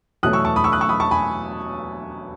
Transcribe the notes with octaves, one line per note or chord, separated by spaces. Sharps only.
E2 B2 F#3 A3 D#6 F#6
C#6 E6
A5 C#6
B5 D#6
C#6 E6
D#6 F#6
C#6 E6
B5 D#6
A5 C#6
G#5 B5